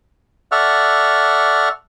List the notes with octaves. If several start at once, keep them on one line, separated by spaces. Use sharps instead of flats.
A4 D5 E5 F#5 C#6 F6